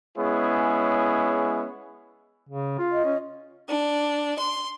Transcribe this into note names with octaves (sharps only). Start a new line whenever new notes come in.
G#3 B3 C#4 E4 G#4 C#5
C#3
F4
D#5
C#4
D4
C6